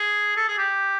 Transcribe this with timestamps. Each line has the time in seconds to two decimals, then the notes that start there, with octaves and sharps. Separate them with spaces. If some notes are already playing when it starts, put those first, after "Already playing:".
Already playing: G#4
0.37 A4
0.48 G#4
0.58 G4